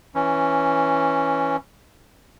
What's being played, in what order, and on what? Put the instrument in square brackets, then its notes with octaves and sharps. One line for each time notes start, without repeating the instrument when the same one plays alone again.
[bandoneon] E3 C#4